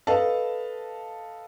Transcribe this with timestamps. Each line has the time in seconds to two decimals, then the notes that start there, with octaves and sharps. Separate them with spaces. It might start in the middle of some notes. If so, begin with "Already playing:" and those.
0.07 A4 B4 D#5 F5 A5